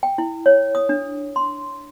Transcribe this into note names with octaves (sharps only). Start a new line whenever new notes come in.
G5
E4
C#5
D#6
D4
C6